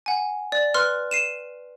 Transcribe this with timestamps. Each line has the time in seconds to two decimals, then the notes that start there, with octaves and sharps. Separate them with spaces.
0.06 F#5 G#5
0.52 D5
0.74 B4 C6 F6
1.11 C7 D#7 E7